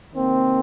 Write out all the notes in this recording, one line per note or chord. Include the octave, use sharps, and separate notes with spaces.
C3 D#3 A#3 C4